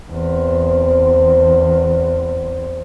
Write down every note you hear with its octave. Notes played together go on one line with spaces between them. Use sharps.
E2 C4